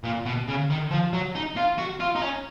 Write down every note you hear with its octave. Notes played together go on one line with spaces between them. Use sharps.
A#2
B2
C#3
D#3
F3
F#3
D#4
F4
F#4
F4
D#4
C#4